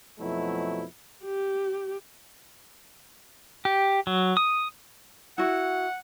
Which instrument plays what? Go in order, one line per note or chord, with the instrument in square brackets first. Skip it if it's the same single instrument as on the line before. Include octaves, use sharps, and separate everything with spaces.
[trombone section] F2 B2 F3 F#3 A3 E4
[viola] G4
[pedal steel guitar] G4
F#3
D#6
[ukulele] E4 F#4 [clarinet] F#5